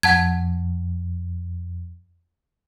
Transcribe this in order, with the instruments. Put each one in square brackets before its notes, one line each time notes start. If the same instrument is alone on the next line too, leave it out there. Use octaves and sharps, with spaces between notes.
[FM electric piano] F2 [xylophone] F#5 A5 G#6